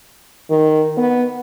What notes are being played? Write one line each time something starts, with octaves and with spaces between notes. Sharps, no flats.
D#3
B3